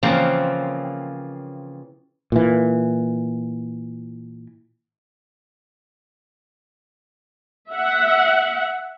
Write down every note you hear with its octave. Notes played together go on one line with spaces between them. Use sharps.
C#3 E3 F3 A#3 C4
A#2 E3
E5 F#5